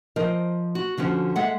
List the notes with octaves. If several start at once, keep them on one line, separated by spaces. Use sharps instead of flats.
F3 A#4 C5 D#5
F#4
D3 F3 C#4 F#4
G#3 A4 E5 F#5